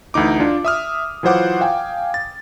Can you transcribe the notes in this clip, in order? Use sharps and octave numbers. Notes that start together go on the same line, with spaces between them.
D2 E3 D#4 D6
D4 F4
E5 D#6 F6
E3 F#3 F4 C5 F#5 D6
F5 G5 G#5
A6